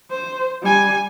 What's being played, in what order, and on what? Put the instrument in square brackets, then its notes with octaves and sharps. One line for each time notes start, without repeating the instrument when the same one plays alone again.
[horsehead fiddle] C5
G3 G#5